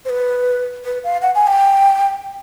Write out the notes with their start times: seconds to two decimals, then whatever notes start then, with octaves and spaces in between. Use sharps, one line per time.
0.05 C5
0.09 B4
0.85 B4
1.04 F5
1.22 F#5
1.35 G#5
1.47 G5